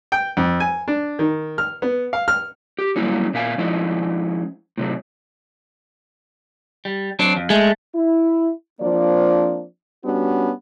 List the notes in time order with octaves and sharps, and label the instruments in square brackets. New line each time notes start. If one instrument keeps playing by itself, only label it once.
[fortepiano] G5
F2
G#5
D4
D#3
F6
B3
F5
F6
[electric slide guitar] G4
F#3 G3 A#3 C#4 E4
A#2 E5 F5 G#5
F3 G#3 C#4 E4 D#5
A2 C3 F#3
[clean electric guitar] G3
F#3 C4 D4
F2
[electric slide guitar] G#3 [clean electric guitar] A3
[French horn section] E4
F3 A#3 C4 D4 D5
G3 B3 C#4 D4 F#4